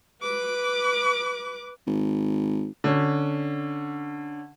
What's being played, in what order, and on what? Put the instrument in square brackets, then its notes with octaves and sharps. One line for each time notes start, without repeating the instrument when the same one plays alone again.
[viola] B4 D6
[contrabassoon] G#1
[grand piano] D3 C#4